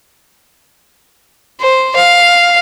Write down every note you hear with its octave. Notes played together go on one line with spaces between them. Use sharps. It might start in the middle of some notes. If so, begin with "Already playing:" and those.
C5
F5